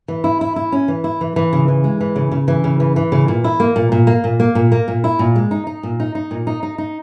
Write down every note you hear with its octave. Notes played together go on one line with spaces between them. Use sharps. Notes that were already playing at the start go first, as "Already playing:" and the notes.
E3
E4
E4
E4
C#4
E3
E4
E3
E3
C#3
E3
G#3
E3
C#3
C#3
E3
C#3
E3
E3
C#3
A#2
E4
A#3
A#2
A#2
A#3
A#2
A#3
A#2
A#3
A#2
E4
A#2
G#3
D#4
D#4
A#2
D#4
D#4
A#2
D#4
D#4
D#4